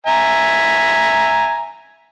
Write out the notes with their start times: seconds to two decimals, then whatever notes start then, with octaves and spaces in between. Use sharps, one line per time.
0.07 E5 G#5 A#5